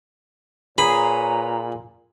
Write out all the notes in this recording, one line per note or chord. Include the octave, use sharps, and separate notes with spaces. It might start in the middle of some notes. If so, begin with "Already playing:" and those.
A#2 G#4 B4 C#5 A#5 B5